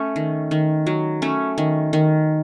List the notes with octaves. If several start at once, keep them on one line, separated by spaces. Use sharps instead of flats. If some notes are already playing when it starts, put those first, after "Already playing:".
Already playing: A3 C#4
D#3
D#3
F#3
A3 C#4
D#3
D#3